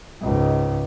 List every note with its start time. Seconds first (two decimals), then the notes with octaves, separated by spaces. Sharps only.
0.21 C#2 G#2